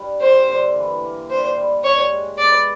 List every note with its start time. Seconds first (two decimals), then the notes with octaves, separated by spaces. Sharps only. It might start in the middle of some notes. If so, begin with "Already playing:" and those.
Already playing: G2 G3
0.20 A#3 C5
0.48 D3
0.76 E3
1.02 A#3
1.29 D4 C5
1.57 G3
1.84 G2 C#5
2.11 G#3
2.38 B3 D5